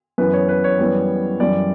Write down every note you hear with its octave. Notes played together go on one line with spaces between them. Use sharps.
F#2 E3 B3 B4
C#5
B4
C#5
F#2 E3 G3 B3
F#2 E3 G3 D5